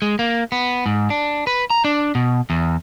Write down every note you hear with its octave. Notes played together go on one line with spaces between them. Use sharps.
G#3
A#3
B3
G#2
D4
B4
A#5
D4
B2
E2